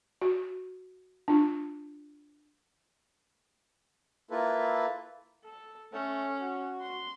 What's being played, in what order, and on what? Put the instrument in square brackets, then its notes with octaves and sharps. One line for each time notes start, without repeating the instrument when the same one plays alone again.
[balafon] F#4
D4 F4
[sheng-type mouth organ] A#3 E4 F4 A4 B4
[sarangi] A4
[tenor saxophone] A3 [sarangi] C#4
[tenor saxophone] F#4
[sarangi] C6